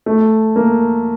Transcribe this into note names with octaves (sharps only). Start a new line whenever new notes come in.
A3
A#3